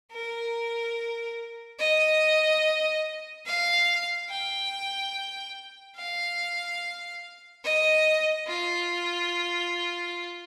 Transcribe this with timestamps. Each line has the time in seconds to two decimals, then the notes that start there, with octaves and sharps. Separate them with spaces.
0.12 A#4
1.79 D#5
3.46 F5
4.30 G5
5.97 F5
7.64 D#5
8.47 F4